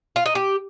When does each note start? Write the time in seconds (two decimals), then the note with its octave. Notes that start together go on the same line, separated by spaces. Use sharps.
0.16 F4
0.26 D#4
0.35 G4